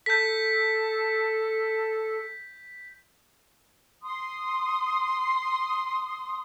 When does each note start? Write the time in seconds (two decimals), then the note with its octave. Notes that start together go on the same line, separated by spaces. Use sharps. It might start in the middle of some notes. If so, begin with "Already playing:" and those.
0.06 A4 G6 B6
4.03 C6 D#6